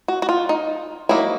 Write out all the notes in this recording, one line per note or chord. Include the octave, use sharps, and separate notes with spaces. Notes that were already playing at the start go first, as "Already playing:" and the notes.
F#4
F#4
F4
D#4
F#3 A#3 D#4 E4